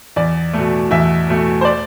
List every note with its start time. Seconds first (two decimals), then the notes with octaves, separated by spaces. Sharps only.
0.16 E2 D5
0.53 B2 A3
0.91 E2 E5
1.28 B2 A3
1.61 C5
1.65 D5